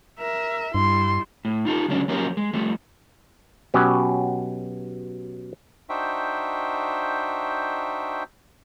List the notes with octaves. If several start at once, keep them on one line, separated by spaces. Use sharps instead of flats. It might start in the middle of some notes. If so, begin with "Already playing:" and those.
A#4 E5
G2 G3 E4 C6
A2
D#4 F4 G4 A4
D2 C#3 F#3 G#3 C#4 D4
F3 F#3 A#3 C#4 G4 A#4
G#3
F3 G3 A3
B2 F#3 C#4 G4
D4 D#4 F#4 C5 E5 G5